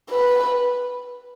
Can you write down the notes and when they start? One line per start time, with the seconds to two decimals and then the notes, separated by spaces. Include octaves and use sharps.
0.11 B4